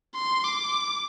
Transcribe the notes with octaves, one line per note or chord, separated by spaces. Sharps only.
C6
D6